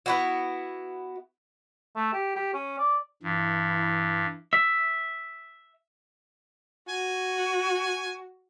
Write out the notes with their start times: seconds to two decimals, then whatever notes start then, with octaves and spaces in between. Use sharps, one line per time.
0.06 B3 E4 F#4
1.96 A3
2.13 G4
2.36 G4
2.53 C#4
2.78 D5
3.23 G2 E3 E4
4.53 E5
6.89 F#4 G#5